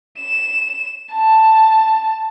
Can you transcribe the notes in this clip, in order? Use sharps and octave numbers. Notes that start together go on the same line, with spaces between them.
E7
A5